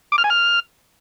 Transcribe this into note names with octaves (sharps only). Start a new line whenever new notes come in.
D6
F6
G#5
F6